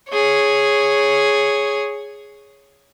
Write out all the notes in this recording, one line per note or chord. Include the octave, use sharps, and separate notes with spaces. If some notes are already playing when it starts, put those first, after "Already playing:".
G#4 C#5